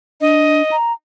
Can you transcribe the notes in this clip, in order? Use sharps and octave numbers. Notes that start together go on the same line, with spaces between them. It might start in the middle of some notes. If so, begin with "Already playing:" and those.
D4 D#5
A#5